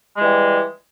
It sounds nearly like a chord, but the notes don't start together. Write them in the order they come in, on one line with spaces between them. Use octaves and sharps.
G#3 E3 G3